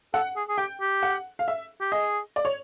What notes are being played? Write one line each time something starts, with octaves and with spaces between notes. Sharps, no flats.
A4 F#5
G#4
G#4
G4 G5
G4
F#5
F5
E5
G4
G#4 D#5
D5
C#5